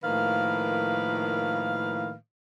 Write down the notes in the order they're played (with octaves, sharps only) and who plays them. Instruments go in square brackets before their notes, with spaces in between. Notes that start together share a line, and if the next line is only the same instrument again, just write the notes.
[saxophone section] A2 D#3 F3 A#3 B4 F5